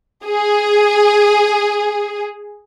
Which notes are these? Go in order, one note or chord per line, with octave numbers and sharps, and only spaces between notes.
G#4